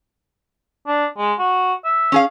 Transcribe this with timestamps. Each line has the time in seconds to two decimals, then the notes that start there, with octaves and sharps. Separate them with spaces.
0.87 D4
1.18 G#3
1.39 F#4
1.84 E5
2.12 C#4 G#4 F5